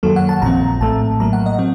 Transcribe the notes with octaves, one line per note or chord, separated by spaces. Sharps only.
F#2 D#3 F#3 A#3 A4
F#5
A5
A#1 A#2 F3 C4 A#5
A#1 A2 A3 A5
A2 F#3 A#3 A#5
F#5
D#5
F#3 C4